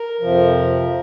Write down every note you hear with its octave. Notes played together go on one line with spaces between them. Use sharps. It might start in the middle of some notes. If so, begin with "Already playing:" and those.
Already playing: A#4
F2 C3 F3
F3